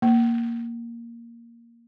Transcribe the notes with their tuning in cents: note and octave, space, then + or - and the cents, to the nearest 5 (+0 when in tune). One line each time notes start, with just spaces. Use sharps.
A#3 +0